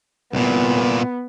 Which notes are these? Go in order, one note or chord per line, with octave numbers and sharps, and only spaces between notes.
C2 A#2 B3